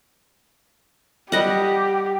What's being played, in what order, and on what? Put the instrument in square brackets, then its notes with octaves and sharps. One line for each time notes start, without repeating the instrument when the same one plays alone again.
[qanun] G3 D#5 F#5 [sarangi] G4